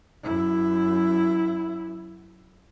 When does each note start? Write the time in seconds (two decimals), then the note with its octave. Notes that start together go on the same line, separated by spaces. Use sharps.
0.24 F#2 E4